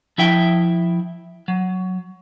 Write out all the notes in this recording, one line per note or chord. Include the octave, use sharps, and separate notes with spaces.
F3 E4 E5 G5
F#3